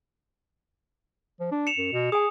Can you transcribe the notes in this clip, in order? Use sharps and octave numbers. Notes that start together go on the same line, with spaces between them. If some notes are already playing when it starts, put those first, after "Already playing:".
F3
D4
C#7 E7 F7
F#2
B2
G#4 G#5 D#6